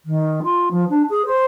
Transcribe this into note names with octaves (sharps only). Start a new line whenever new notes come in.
D#3
F4
F3
D4
G#4
C5